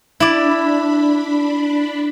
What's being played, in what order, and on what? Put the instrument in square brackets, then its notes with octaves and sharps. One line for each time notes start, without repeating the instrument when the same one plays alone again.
[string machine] D4 B5 [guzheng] E4 D5